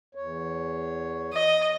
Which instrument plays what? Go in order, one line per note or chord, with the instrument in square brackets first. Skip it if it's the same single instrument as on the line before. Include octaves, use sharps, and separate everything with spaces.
[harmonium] E2 C#5
[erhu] D#5